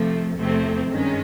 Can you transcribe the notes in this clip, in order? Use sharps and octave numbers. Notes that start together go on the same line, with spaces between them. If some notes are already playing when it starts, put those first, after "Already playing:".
Already playing: C3 F3 A3
E2 C3 F3 A3 C4
G2 D#3 G#3 C#4